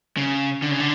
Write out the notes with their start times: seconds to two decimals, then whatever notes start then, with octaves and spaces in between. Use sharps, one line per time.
0.17 C#3
0.62 D3
0.71 C#3
0.80 D3